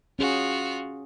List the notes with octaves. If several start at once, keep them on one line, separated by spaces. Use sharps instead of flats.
C#4 F4 F#4 G#4